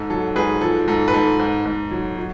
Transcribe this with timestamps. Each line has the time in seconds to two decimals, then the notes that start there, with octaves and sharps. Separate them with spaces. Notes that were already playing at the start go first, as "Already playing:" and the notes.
Already playing: G#2 A4
0.10 F#3 A4
0.36 G#2 G#4 B4
0.61 F3 A4
0.88 G#2 A4
1.08 B4
1.13 G#2 A4
1.39 G#2
1.65 G#2
1.91 F#3
2.17 F#3